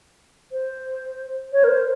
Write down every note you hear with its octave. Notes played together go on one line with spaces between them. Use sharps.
C5
C#5
A#4
C5